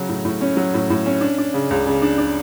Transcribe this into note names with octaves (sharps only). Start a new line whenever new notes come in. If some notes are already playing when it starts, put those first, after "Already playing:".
Already playing: C#3 F#3
A2
A2
C#4
F#3
A2
A2
C#4
D4
D4
C#3
C#2
C#3
D4
D4